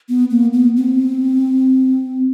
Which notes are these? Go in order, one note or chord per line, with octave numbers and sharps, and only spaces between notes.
B3
A#3
B3
C4